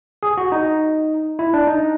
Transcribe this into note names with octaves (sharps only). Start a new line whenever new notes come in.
G#4
F#4
D#4
E4
D4
D#4